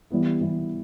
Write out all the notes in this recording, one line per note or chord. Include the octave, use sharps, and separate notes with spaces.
E3 G3 B3 E4
E3 G3 B3 E4